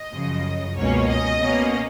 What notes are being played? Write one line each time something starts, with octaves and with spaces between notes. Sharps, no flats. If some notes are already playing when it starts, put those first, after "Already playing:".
Already playing: D#5
F#2 C#3 F3
C#2 B2 A#3 C#4 C#5
D#5
B2 A#3 C#4